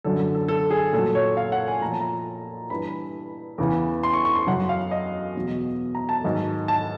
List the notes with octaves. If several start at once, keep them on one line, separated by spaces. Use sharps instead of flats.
F#2 D3 F#3 A4
A4
A4
A4
G#4
A#2 F#3 A4
C#5
F5
F#5
G#5
A#2 F3 A#5
A5
A#5
G2 E3 B5
E2 C#3 E3
C6
C#6
C#6
C6
F#2 C#3 F#3 F#5
F5
D#5
E2 B2 F#3
A#5
A5
G#2 D#3 F#3
A5